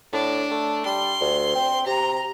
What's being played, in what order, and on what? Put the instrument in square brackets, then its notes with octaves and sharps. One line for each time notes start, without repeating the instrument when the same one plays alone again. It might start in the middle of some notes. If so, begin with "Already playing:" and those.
[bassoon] A2 [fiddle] D4
[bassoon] A3
[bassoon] G3 [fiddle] C6
[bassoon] D2
C4
[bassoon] C3 [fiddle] A#5